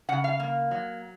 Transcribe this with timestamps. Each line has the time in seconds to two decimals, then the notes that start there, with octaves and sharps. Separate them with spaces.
0.09 C#3 F#5
0.24 F5
0.40 A#3
0.71 F#3